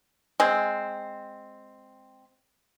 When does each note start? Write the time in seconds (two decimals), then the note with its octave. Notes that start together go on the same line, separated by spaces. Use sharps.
0.40 G#3 C4